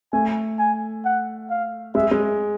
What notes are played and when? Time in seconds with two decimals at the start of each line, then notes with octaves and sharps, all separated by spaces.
0.13 A3 G#5
0.59 G#5
1.05 F#5
1.50 F5
1.95 G#3 E5
2.11 G#3